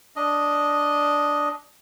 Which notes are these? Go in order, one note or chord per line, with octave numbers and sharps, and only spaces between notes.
D4 D#5